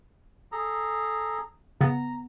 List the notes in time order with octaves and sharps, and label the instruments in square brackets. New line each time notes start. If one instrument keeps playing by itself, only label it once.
[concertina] G#4 A4 A#5
[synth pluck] C#3 B3 [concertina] A#5